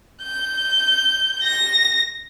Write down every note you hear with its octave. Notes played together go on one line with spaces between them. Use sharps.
G6
A#6